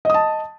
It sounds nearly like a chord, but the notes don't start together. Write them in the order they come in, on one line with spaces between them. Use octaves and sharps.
D#5 D#6 A5